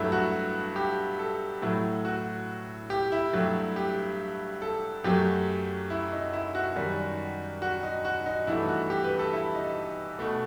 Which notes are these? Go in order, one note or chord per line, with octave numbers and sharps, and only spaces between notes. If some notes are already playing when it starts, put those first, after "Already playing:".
Already playing: G2 F#3 A3 E4
F#4
G4
A4
A2 F#3 A3 E4
F#4
G4
E4
G2 F#3 A3
G4
A4
F#2 F#3 A3 G4
E4
D#4
E4
F#4
F#2 D#3 G3
F#4
D#4
F#4
D#4
G2 E3 A3 E4
F#4
G4
B4
A4
E4
D#4
B2 A3